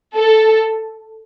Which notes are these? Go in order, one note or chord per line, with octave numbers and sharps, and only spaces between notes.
A4